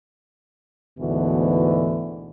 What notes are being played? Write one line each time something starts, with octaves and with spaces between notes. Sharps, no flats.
D2 G#2 B2 D3 E3